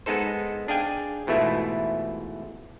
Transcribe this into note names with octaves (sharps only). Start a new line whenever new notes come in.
G#3 B3 D#4 A4 C5
D4 G#4 F5 G5 G#5
G#2 B2 E3 A3 E4 F4